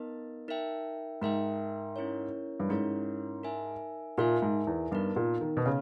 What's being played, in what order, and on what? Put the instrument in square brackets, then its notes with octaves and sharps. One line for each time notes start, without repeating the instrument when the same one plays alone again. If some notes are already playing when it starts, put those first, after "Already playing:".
Already playing: [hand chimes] B3 D#4 A#4 D#5
D#4 A#4 E5 G5
[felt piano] G#2 [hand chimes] D#4 A#4 E5 G5
[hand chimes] C#4 E4 A#4 C#5
[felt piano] G2
[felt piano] G#2 [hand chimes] C#4 E4 A#4 C#5
[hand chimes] D#4 A#4 E5 G#5
[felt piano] A#2 [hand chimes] D#4 A#4 E5 G#5
[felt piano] G#2
E2
[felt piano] G2 [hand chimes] B3 D#4 A#4
[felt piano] A#2
D#3
B2
[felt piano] C#3 [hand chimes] B3